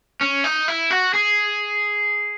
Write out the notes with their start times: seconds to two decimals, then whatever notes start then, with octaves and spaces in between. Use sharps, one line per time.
0.21 C#4
0.44 D#4
0.68 E4
0.91 F#4
1.14 G#4